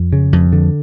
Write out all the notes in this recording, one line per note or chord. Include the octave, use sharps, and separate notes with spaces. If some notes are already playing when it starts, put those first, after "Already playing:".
Already playing: F2
C#3
F2
D3